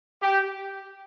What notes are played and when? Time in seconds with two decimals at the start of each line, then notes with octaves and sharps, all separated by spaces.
0.22 G4